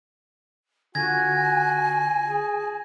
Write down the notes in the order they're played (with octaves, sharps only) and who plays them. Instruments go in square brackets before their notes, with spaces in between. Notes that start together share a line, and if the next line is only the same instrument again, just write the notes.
[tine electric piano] D3 F4 [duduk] F#4 [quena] G#5 [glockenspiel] G#6 A#6
[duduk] G#4